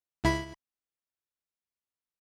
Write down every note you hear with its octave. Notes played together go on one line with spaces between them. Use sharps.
C#2 E4 B5